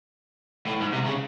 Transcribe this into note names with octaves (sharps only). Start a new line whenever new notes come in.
A2
G#2
C3
C#3